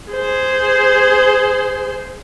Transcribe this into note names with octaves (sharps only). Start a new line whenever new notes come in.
G#4 C5